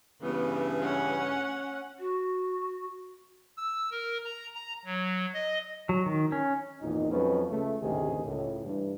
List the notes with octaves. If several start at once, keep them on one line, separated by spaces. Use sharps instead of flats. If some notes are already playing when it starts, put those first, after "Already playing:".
G2 C#3 E3 B3
C#4 F#5
F#4
E6
A#4
A#5
A#5
F#3
D#5
F#3
D#3
C#4
G#1 E2 A#2 D#4
F2 F#3 G#3 C#4 B4
C#2 A3
A1 D2 G#2 C3 D#3 G#4
C#2 A2
G2 E3